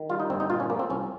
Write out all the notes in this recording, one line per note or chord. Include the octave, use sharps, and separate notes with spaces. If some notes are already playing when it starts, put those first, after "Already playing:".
Already playing: D#3
G3 F4
D#4
G1 C4
D#4
A#2 F4
C#4
F3 A#3
C4
C2 C#4